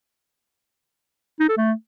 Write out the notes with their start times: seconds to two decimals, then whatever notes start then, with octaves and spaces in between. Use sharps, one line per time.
1.40 D#4
1.49 A4
1.57 A3